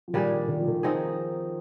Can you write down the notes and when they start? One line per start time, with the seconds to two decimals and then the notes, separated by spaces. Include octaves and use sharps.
0.08 F3
0.13 A#2 D#3 G3 D4 G#4
0.48 D#3
0.59 F3
0.68 D#3
0.83 F3 C4 D#4 G#4